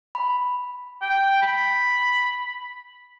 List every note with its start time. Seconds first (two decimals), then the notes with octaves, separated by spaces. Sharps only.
0.15 B5
1.02 G5
1.42 B5